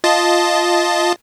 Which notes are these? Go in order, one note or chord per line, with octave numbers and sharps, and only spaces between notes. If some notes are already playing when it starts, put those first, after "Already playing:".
F4 D#5 A5